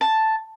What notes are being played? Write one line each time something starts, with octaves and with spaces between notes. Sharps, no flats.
A5